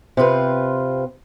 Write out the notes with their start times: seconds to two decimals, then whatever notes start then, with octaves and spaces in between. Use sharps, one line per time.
0.17 C3 C4 F4 B4